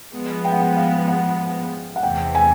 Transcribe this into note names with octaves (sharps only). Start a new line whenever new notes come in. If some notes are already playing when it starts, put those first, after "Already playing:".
F3 G#3 B3
G5
F#5
G5
F5
F#5
F#5
E2 C3 E3 G5
G#5